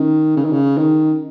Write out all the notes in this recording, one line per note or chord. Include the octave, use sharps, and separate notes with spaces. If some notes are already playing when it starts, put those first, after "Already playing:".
Already playing: D#3 C#4
C#3
D#3
C#3
D#3